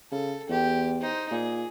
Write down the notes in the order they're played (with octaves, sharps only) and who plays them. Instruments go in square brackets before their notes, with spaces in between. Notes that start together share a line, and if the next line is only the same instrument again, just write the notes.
[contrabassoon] C#3 [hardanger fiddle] A4
[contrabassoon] E2 [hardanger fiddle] G4
[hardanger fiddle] D#4 C5
[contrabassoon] A#2 [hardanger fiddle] G#4